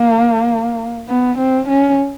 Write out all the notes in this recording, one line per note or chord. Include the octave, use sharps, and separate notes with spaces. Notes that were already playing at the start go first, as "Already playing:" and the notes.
Already playing: A#3
B3
C4
C#4